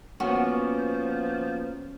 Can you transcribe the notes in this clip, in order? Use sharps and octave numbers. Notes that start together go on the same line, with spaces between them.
F3 A#3 B3 C#4 F#4